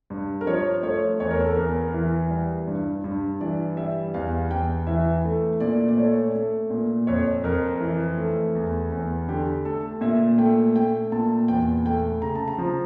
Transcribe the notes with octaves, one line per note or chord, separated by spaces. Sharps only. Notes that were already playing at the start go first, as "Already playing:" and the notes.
G2
A#4
F3 C#5
A3 C#5
E2 C#5
A#4
A4
A#4
E2
E3
G3
G2
G2
E3 D5
G3 E5
E2 F5
E2 G5
E3 E5
A3
A#2 D5
D5
A3 C#5
A3
A#2
F2 C#5
F2 A#4
E3
A3
E2
E2
D3 G4
A3 A4
A#2 E5
A3 G5
A3 G5
A#2 A5
E2 G5
A3 G5
C#3 A#5
A5
A#5
F3